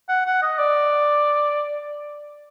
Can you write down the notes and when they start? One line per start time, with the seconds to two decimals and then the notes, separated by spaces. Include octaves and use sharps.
0.09 F#5
0.26 F#5
0.42 D#5
0.59 D5